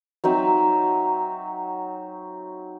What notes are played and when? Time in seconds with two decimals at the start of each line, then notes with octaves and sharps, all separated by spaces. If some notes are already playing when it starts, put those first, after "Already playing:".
0.24 F#3 C4 D#4 E5